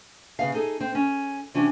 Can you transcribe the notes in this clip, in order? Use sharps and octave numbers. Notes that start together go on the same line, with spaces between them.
C#3 B3 F5
D#4 G#4 A4
C4
C#4
C3 E3 C#4 D4 F#4